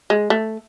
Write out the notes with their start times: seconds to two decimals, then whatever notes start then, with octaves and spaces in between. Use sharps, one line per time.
0.10 G#3
0.30 A3